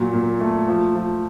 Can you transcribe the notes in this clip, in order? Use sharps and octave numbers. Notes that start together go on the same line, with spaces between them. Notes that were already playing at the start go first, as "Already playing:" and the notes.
Already playing: A#2 F#3
A#2
A3
F3
F3